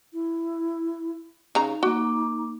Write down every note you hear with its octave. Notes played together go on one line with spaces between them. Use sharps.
E4
C#3 D#4 A#5
A#3 F#4 D6